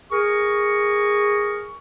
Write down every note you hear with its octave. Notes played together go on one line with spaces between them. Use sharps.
G#4 A#4 C#6